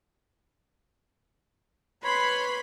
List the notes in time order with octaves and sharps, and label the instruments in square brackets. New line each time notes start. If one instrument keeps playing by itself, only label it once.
[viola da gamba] B4 [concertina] C#5 [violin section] B5 [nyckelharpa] C6